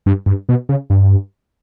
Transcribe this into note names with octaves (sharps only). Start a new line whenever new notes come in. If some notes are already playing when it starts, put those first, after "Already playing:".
G2
G2
B2
C#3
G2